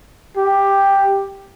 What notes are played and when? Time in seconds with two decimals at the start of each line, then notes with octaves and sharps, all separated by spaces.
0.38 G4